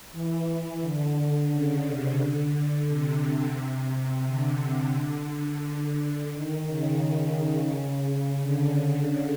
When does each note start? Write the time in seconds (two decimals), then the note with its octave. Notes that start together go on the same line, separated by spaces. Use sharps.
0.12 E3
0.81 D3
1.50 C#3
1.85 C3
2.19 D3
2.88 C3
4.26 D3
6.33 D#3
6.67 C#3
7.02 C#3
8.39 D3